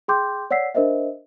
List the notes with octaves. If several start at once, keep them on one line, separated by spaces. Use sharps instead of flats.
G#4 G5 C6 D6 G6
C#5 D5 F#5 E6 B6 C7
D4 A#4 C5 D#5 E5